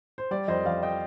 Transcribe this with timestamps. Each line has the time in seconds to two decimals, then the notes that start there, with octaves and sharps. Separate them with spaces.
0.18 C5
0.31 G3 D5
0.48 F2 C5 D#5
0.65 F2 D5 F5
0.83 D#5 G5